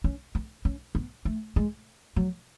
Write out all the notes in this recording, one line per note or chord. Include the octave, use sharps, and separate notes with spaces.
C#4
B3
C#4
B3
A3
G#3
F#3